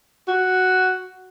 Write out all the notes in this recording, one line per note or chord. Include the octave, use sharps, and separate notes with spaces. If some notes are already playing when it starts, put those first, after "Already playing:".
F#4